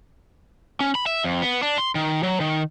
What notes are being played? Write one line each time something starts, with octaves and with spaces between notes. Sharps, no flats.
C#4
B5
E5
F2
B3
D4
C6
D#3
F#3
D#3